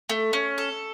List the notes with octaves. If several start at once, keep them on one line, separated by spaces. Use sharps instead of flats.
A3
C#4
A4